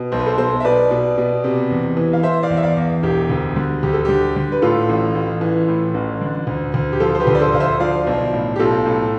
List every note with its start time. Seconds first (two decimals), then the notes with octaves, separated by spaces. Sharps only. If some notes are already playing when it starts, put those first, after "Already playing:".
Already playing: B2
0.12 B1 C5
0.19 B4
0.27 A4 C5
0.38 B1 A4 C5
0.60 E5
0.65 B2 B4 D5
0.91 B2
1.17 B2
1.44 C3
1.70 E2
1.97 E3
2.13 F5
2.23 E3 C5 E5
2.43 D5 F5
2.50 E2
2.57 E5
2.63 D5 F5
2.77 E2
3.03 E1 G4
3.30 D2
3.56 D3
3.83 D2 G4
3.93 A4
4.05 D3 G4
4.36 D3
4.52 B4
4.62 A2 F4 A4
4.89 A1
5.15 A1
5.41 E3
5.68 A2
5.94 A1
6.21 D3
6.47 D2
6.74 D2
6.93 G4
7.00 F3 F4 A4
7.15 C5
7.20 G4 B4
7.27 D2
7.35 D5
7.40 A4 C5
7.53 D2 F5
7.60 C5 E5
7.80 F3 D5 F5
8.07 B1
8.34 A2
8.56 G4
8.59 B1 F4 A4
8.86 A2